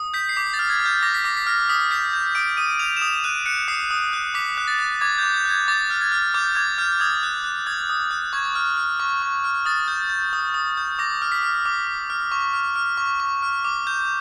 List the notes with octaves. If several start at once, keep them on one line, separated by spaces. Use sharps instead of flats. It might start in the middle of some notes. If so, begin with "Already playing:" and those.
Already playing: D#6
G6 B6
C7
D6 B6
A6
F6
G#6
F6
G6
D6 A#6
B6
D6 A#6
B6
F6 A#6
D#6 B6
G6 B6
G6
D#6 D7
D#6 D#7
G6 F7
E7
D#6 F7
F#6 D#7
F#6 C#7
D#6 C7
D#6
F#6
D6 B6
F#6
A6
F#6
D6 G#6
D6 G6
G6
F#6
G#6
D6 A6
F6
G#6
F6
D6 G6
D6 G#6
F6 G6
D#6 G#6
F#6
F#6
D#6 G#6
D#6
F#6
C#6 G#6
F6
F6
C#6
C#6
F6
D#6 A6
G6
G6
D#6
D#6
G6
D6 A#6
F6
B6
F6
D6
D6
F6
C#6
F6
F6
C#6
C#6
F6
D6
G6